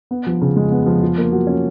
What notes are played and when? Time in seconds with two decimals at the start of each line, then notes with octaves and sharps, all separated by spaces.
0.11 B3
0.27 F3
0.42 C#3
0.56 G#3
0.72 B3
0.86 F3
1.02 F4
1.18 A#3
1.32 F#3
1.47 C#4